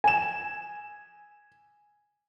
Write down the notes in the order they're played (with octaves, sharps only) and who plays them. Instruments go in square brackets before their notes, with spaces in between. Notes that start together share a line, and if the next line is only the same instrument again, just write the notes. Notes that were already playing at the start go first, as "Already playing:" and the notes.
[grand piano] G#5 E7